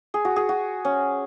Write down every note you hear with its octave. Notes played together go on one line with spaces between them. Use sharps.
G#4
F#4
G#4
F#4
C#4